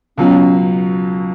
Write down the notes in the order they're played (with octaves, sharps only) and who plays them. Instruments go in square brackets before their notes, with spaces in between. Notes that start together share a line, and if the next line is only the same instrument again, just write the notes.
[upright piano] C#2 B2 F#3 [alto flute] C#4